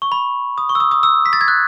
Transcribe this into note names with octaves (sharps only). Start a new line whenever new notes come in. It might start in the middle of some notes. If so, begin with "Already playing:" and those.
C#6
B5
D#6
C#6
E6
D#6
D#6
E6
B6
A6
G#6
F#6